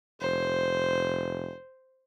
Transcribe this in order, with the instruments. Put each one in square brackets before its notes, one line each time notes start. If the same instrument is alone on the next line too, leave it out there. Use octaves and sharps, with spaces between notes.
[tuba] F1 [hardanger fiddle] C5